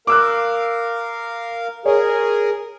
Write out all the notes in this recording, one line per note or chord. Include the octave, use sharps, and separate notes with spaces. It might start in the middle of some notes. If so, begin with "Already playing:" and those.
A#4 F5 D6 E6 F#6
G#4 A#4 C#5